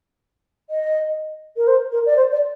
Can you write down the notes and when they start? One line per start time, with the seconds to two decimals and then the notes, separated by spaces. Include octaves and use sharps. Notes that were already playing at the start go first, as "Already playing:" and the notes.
0.70 D#5
1.57 A#4
1.67 C5
1.92 A#4
2.06 D5
2.16 C5
2.31 D5